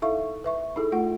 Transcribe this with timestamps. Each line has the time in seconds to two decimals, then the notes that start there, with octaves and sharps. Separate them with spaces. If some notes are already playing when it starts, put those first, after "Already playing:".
0.02 D#4 E4 A4 E5 F5 C#6
0.44 B4 E5 C#6
0.76 D#4 E4 G#4 A4
0.92 A3 F4 F#5